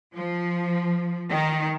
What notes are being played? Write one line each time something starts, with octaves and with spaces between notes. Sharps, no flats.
F3
D#3